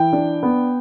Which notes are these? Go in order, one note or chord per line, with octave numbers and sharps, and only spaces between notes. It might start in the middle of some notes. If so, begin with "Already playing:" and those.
Already playing: E3 G5
D4
B3